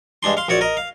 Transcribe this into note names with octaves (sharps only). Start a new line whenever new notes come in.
G2 G#3 D4 C6
F5 C6
A#1 F#4 C#5 D5
A#4 D#5
F5